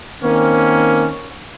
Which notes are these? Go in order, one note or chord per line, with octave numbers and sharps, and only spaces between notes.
D#3 A#3 C4 C#4